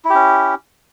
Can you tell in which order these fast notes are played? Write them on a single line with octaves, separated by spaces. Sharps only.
E4 G4 C#4